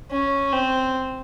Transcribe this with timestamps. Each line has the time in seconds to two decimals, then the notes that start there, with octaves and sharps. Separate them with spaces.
0.11 C#4
0.53 C4